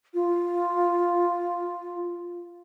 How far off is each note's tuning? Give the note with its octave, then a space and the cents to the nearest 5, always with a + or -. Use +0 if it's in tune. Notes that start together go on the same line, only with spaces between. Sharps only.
F4 +0